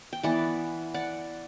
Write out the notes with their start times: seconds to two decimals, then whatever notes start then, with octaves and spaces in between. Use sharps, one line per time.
0.13 G5
0.23 E3 B3 D5 F#5
0.94 D5 F#5